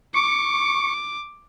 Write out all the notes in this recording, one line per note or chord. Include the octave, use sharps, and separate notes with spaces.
C#6 D6